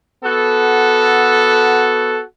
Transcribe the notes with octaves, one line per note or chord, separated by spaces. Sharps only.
B3 F#4 A4